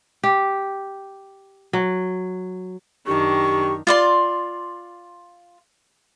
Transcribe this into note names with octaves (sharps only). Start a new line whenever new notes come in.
G4
F#3
F#2 D#3 D4 G4 C#6
F4 D5 C6